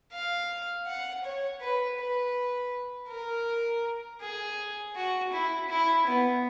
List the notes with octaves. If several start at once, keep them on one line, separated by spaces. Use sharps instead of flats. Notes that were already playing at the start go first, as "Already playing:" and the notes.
F5
F#5
C#5
B4
B4
A#4
G#4
F#4
E4
E4
B3